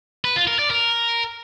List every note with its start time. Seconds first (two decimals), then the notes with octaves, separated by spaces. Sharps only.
0.25 B4
0.36 F4
0.48 A#4
0.59 D5
0.71 A#4